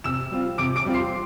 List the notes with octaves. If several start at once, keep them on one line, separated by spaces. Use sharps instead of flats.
C3 E6 E7
G3 C4 F4
C3 D6 D7
D6 D7
G3 C4 F4
C6 C7